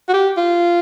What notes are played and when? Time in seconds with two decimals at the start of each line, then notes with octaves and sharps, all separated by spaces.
0.09 F#4
0.14 G4
0.37 F4